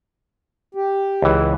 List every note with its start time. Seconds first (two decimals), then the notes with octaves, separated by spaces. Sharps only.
0.75 G4
1.22 C#2 E3